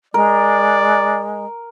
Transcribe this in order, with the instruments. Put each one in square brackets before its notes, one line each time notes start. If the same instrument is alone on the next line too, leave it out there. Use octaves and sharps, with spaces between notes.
[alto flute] G#3 [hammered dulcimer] A#4 [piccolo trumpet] D5